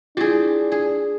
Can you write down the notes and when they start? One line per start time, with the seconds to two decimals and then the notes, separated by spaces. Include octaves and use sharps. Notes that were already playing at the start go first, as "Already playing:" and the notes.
0.17 D4 E4 F4 G4 G#4
0.72 G#4